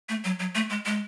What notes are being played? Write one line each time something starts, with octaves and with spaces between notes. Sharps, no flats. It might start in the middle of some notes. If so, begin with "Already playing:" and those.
A3
F#3
F#3
A3
G#3
G#3